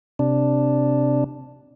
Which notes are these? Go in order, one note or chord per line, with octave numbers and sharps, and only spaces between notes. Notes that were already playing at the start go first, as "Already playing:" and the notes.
C3 D4